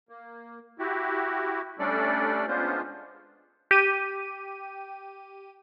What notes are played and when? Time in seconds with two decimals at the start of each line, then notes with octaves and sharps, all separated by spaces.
0.09 A#3
0.79 E4 F#4 G4
1.79 G3 A3 C#4 D4 A4 D5
2.48 G#3 B3 C#4 D4 F4 C5
3.71 G4 D#7